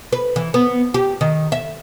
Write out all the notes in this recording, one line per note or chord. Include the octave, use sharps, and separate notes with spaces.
B4
E3
B3
G4
D#3
E5